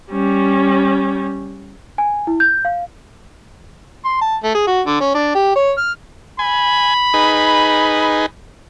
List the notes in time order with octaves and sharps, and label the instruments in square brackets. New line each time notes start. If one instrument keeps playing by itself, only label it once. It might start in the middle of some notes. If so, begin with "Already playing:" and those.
[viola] G3 C#4
[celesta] G#5
E4
G6
F5
[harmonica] C6
A5
A3
G#4
F#4
D3
C#4
D4
G4
C#5
F6
[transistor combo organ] G#5 [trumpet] B5
[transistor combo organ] D#4 G#4 B4